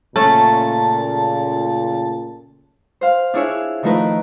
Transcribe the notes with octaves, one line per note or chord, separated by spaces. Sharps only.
A#2 C#3 A3 C#4 A5
C5 F5
D4 E4 G#4 C#5 E5
D#3 F3 A3 D#4 A#4 B4